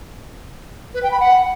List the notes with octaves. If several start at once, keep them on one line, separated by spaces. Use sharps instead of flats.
B4
G5
B5
F#5